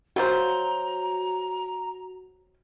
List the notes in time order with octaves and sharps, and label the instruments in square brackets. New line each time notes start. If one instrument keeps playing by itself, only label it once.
[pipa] F#3 F4 C5 [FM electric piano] F#4 [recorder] A#5